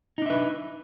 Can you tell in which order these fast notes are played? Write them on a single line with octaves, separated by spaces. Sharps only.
D#4 D4 E5 B4